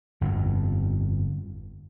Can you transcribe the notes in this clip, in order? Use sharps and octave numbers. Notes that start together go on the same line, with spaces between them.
G1 F2